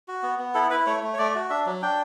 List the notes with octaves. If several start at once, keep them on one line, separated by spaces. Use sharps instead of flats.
F#4
B3
B3
E4 A4
E4 B4
A3 C#5
A3
C#5
A3 D5
F#4
D4 E5
F#3
D4 G5